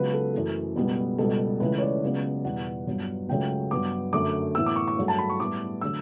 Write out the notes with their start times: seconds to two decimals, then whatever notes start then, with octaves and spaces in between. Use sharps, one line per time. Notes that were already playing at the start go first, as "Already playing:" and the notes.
Already playing: C#2 C#3 F#3 B3 B4
0.14 A4
0.34 F#2 E3 A3
0.76 C#2 B2 G3 B3
1.18 C#2 B2 G3 B3 A4
1.60 C#2 C#3 E3 A3 B4
1.78 C#5
1.82 D5
2.03 C#2 C#3 F#3 B3
2.45 E2 B2 G3 F#5
2.87 G2 F#3 B3
3.29 C#2 C#3 F#3 A3 G5
3.71 G2 F#3 B3 D6
4.13 F#2 D3 F#3 A3 D6
4.55 A2 E3 B3 E6
4.66 D6
4.76 C#6
4.87 C#6
4.98 G2 F#3 A3
5.08 A5
5.18 B5
5.30 C#6
5.40 A2 G3 B3 D6
5.81 D3 F#3 A3 E6